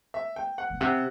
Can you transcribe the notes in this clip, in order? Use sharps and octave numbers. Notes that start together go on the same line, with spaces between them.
E5
G5
F#5
B2
C3 F#5